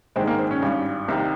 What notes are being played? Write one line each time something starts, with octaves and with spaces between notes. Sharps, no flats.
A#1 G#2 D#3 G#3 C4
A#3
C4
C#4
G#1 G2 G3
C2 C3 D#3 G3